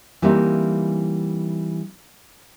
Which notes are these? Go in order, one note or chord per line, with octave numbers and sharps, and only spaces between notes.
E3 G3 A#3 C4 D#4